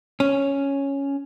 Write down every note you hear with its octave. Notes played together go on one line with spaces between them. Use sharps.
C#4